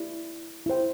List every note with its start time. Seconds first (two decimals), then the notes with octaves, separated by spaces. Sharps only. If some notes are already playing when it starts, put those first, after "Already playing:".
Already playing: E4 G4 D5
0.66 E4 G4 C5 G5